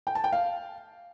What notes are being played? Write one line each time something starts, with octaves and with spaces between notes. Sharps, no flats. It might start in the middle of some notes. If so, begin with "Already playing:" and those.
G5
A5
G5
F5